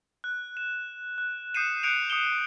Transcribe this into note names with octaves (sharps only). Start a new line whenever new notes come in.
F#6
E7
F#6
D#6 G6 C7 C#7 D#7 E7
D#6 F#6 G6 C#7 D7 F7
D#6 C#7 E7 G7